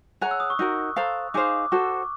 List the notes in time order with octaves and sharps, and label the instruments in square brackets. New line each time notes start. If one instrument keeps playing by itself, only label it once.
[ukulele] G#4 C#5 F#5 A#5 [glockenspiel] F#6
[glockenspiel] E6
D#6
C#6
[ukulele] D#4 F#4 A#4
A4 C5 F5 A#5
[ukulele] D#4 G#4 C5 F5 [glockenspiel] D6
[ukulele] F#4 A4 C5 [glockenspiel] C#6